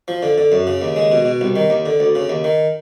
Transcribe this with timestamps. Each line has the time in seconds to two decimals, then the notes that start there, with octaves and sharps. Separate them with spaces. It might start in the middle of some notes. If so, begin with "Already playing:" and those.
0.08 F3
0.23 D3
0.38 D3
0.52 F#2
0.67 C#3
0.82 D#2
0.96 G#3
1.12 B2
1.25 B2
1.41 C2
1.56 D#3
1.70 D#2
1.86 D3
2.00 D2
2.15 C#3
2.30 D#2
2.44 D#3